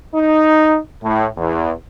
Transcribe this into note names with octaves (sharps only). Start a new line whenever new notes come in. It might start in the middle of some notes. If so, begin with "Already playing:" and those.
D#4
A2
E2